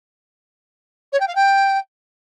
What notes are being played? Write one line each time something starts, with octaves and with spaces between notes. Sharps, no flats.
C#5
G5
F5
G5